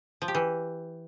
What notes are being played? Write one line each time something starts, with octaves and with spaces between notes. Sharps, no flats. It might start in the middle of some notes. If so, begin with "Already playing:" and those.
F3
G4
E3